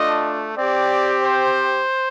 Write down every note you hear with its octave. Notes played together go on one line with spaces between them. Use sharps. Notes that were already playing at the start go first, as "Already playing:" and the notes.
Already playing: A3 D4 F4 D#5
C4 G4 D5
C5